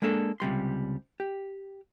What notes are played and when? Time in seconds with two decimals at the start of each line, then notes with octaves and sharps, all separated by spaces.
0.02 G#3 A#3 D4 A4
0.40 C#2 C3 G3 C6
1.20 G4